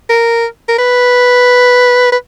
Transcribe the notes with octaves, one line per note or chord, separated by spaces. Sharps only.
A#4
A#4
B4
B4